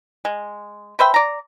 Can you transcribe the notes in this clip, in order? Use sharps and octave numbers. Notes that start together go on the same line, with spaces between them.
G#3
B4 C5 E5 G5
D5 A#5